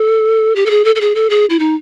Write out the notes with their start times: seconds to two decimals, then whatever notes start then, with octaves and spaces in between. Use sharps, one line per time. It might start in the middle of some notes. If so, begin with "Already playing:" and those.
Already playing: A4
0.56 G4
0.66 A4
0.70 G#4
0.85 A4
0.96 A4
1.01 G#4
1.15 A4
1.30 G#4
1.50 E4
1.59 D#4